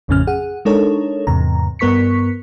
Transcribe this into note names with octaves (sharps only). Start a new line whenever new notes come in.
A1 F2 A2 C#3 C#4 F6
G#4 F#5
G#3 D4 D#4 A4 A#4 C#5
E2 G#2 C3 A#5
G2 B3 A#4 C#6 B6 C#7